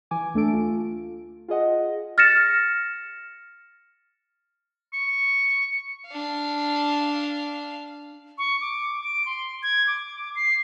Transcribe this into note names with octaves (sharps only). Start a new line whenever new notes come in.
E3 G#5 D6
D2 A3 D4 A4 D7
F4
F4 G#4 D#5 F#5
F6 A6 A#6 C#7 E7
C#6
D4 F5
C#6
D6
D7
C6
G#6
D6
C7